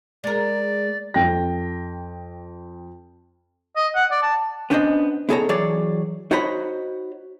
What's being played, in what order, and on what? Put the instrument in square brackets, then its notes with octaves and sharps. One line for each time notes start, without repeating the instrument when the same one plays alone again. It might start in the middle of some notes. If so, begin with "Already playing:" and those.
[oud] G#3 A#4 [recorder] D5
[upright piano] F2 G5 A#6
[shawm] D#5
F#5
D5
A5
[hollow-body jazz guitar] B3 C#4 D4 C5 C#5 D#5
B3 D#4 G#4 A4 C#5 A#5
E3 F#3 G#4 C#5 D5
D#4 F#4 C5 C#5 A#5 B5